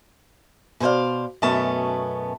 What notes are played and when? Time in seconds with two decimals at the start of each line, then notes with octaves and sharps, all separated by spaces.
0.80 B2 G#4 C5 D5 F5
1.42 F#2 B2 A3 B3 C#4 A5